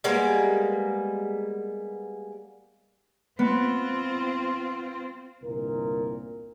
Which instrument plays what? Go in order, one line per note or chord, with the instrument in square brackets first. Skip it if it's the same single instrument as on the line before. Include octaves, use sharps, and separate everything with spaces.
[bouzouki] G3 G#3 A#3 B3
[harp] B3 [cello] C4 F4
[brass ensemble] G1 C2 A#2 A#4